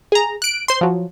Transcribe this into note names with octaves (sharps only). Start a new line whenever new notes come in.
G#4 A#5
F#6 D7
C5 C6
F3 F#3